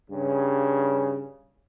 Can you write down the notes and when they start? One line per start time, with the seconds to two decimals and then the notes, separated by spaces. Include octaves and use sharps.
0.11 G2 C#3